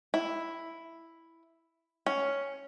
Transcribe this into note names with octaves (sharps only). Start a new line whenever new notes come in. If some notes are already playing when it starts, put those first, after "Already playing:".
E4
C#4